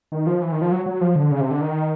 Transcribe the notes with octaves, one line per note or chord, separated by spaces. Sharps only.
D#3
F3
E3
D#3
F3
F#3
F#3
F3
D3
C#3
C3
D3
D#3